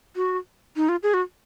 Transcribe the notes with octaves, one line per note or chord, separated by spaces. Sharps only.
F#4
D#4
F4
G#4
F#4